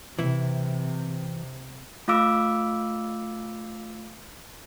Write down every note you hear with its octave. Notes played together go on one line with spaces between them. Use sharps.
C3 E3 E4
A3 F4 F5 D6 E6 D7